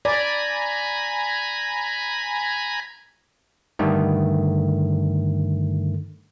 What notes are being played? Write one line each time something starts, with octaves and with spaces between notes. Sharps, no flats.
D5 G#5 A#5 B5
G2 D3 D#3 A3